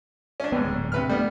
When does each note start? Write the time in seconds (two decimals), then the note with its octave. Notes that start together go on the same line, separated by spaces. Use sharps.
0.40 C#4 D4
0.52 D#2 G#2 B3
0.65 D1
0.92 C3 B4 F6
1.09 G3 A3 B3